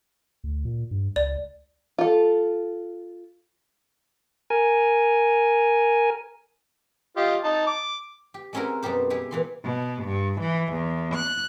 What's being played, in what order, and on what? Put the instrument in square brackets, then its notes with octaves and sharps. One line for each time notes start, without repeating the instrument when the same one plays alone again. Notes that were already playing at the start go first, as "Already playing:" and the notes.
[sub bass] D2
A#2
G2
[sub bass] C#2 [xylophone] D5
[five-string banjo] F4 A4
[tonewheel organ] A#4 G#5
[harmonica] F4 G4 D#5
D#4 A5
D6
[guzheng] G4
G#3 C4 C#4 E4 F#4 A#4
F#2 B2 G3 G4 C5
G#3 E4 G4
A#2 E3 C6
[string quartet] B2
G2
E3
E2
F#6